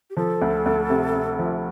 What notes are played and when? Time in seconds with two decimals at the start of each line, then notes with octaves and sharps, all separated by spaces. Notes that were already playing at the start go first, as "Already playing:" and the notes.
0.10 G4
0.17 F3 A4
0.42 D2
0.66 D2
0.90 C3
1.14 C3
1.39 F3